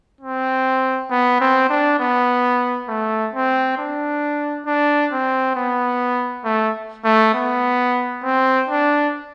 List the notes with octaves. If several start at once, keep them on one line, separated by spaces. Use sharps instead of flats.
C4
B3
C4
D4
B3
A3
C4
D4
D4
C4
B3
A3
A3
B3
C4
D4